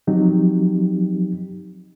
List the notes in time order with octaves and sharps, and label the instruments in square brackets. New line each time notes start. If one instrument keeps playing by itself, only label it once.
[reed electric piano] F3 F#3 C4 D#4 G4